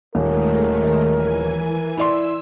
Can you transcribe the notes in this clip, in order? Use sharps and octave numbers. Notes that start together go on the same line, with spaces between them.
D#1 D#3 G#3 A3 A#4
E3 G#5
E4 D5 C6 E6